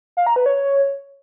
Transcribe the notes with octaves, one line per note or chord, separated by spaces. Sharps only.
F5
A#5
B4
C#5